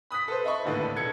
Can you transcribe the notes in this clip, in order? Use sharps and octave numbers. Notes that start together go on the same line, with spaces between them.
B5 D#6 F#6 B6
A4 B4 C5
D#5 E5 B5 C#6
G#1 D#2 A2 D3 A4 B4
E1 A4 G#6 C#7